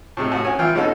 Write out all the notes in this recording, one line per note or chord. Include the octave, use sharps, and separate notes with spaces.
A2 C3 G#3
A2 F#4 D#6
C#4 G#5
E3 E4 F4 G5
B2 G#3 C#4 D#4 F#4 A4